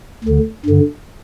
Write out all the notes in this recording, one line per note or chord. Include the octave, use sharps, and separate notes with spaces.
D2 D3
G2 D3